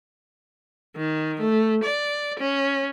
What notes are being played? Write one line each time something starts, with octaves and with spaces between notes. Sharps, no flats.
D#3
A3
D5
C#4